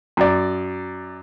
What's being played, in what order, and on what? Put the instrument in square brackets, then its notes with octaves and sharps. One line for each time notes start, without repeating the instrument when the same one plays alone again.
[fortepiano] F#2 D5